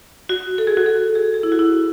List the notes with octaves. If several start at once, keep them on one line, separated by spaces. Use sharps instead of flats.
F#4
A4
G#4
F#4
A4
G#4
A4
G#4
E4
F#4
E4